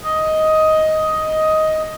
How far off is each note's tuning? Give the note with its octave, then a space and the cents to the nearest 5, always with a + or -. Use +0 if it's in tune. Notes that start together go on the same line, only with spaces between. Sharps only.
D#5 +10